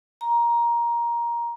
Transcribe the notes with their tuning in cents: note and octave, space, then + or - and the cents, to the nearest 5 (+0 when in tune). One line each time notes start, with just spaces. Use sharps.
A#5 +15